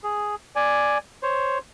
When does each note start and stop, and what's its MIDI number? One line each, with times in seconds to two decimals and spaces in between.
0.03 0.35 68
0.56 0.98 74
0.56 0.98 80
1.23 1.58 72
1.23 1.58 73